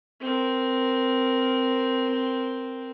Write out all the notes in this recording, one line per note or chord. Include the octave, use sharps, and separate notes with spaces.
C4 A#4